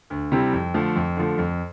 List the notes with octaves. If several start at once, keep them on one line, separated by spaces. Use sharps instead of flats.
D2
C3 G3 C4 E4
F2
D3 F3 A3
F2
D3 F3 A3
F2